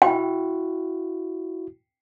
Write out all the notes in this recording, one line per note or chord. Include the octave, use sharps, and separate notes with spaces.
E4 F#4 G5